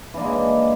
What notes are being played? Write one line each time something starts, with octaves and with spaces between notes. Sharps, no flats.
E3 G#3 A#3 D4